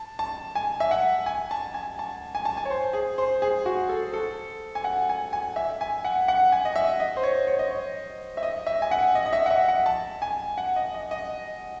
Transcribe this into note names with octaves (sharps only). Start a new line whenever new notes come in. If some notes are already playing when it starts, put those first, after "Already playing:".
Already playing: A5
A5
G#5
E5
F#5
G#5
A5
G#5
A5
G#5
A5
G#5
C#5
C5
G#4
C5
G#4
F#4
A4
A4
G#5
F#5
G#5
G#5
E5
G#5
F#5
F#5
G#5
D#5
E5
D#5
C5
C#5
C#5
D#5
C#5
E5
D#5
E5
G#5
F#5
D#5
D#5
E5
F#5
E5
F#5
A5
G#5
F#5
D#5
D#5
D#5